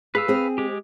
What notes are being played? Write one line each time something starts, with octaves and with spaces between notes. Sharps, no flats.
G#4 B4 F5 E6
C4 G#4
G#3 G4